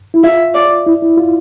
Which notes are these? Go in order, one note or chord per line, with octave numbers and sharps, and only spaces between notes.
E4
F4 E5
D5
E4
E4
F4